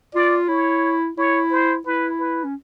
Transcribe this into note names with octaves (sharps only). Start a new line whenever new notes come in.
F4 D5
E4 C#5
E4 C#5
C5
E4 B4
B4
C#4